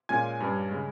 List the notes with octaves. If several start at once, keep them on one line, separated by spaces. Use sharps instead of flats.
A#2 G#3 C#4 F4 G#5 G#6
G2 G3 C#4
C#3 G#3